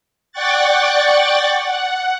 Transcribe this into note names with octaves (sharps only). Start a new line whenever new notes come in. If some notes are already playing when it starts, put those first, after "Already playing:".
D5 F#5 G5 C#6 F#6 A6
F#5